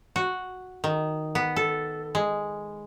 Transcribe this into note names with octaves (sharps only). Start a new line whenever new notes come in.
F#4
D#3
B3
A4
G#3